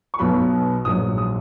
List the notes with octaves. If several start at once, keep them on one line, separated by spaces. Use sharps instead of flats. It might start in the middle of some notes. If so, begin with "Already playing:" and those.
C#6
B1 B2 F#3 B3 B5
A#1 G#2 F#3 D#6
D#6